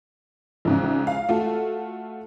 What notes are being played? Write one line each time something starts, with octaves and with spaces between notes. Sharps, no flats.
A#1 G#2 C#3
F5
A3 F4 F#4 A4